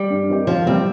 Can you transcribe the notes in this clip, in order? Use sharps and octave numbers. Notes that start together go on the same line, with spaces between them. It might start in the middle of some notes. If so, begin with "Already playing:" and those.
Already playing: G3
G2
D#3 C4 D#4 G4
F2 F3
C3 G3 C4